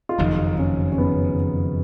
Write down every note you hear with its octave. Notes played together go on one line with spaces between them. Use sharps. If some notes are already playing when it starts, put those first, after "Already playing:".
F4
F#1 F2 D#3 D#4
C#4
C#4
B3